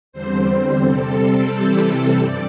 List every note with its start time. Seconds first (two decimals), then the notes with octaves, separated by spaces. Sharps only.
0.12 E2 D3 G3 C4 C5
0.81 C3 G3 C4 A4
1.48 C3 E3 G3 C4
2.16 G2 D5